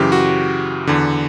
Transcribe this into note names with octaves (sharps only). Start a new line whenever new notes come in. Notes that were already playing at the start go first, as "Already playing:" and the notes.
Already playing: F#2 C#3 E3 G4
F#4
E2 D3